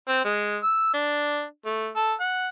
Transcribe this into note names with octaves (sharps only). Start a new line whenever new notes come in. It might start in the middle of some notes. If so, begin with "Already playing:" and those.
C4
G#3
E6
D4
A3
A4
F#5